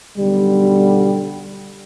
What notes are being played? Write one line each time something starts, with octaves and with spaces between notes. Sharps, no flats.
B1 D3 G3